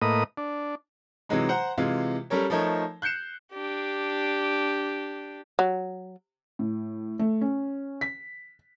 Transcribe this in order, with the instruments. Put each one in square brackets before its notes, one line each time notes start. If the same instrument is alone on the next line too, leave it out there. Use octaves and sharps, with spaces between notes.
[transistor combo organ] A2 A#3 B4 D#5 D#6
D4
[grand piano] C3 E3 F#3 G#3 D#4
C5 F#5 A#5
C3 E3 G#3 F4
G3 C#4 A4 A#4 C#5
F3 A3 D#4 A#4 C#5
F#6 G6 C7 C#7 E7
[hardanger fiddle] D4 G4
[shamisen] F#3
[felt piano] A2
A3
C#4
B6